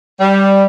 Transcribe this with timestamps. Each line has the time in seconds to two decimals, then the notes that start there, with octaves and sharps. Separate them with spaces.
0.21 G3